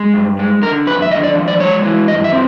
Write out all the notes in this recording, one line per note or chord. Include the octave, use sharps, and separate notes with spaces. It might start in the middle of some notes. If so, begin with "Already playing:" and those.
Already playing: G#3
G2
G#3
D3 A#4
F2 B4
E5
D3 D#5
D5
F3
D5
G#3 C#5
E3
G2 D#5
E5
C4